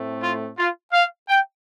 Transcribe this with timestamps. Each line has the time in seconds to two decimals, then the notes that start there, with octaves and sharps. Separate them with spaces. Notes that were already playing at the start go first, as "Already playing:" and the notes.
Already playing: A2 A3 C4
0.22 F4
0.58 F4
0.92 F5
1.29 G5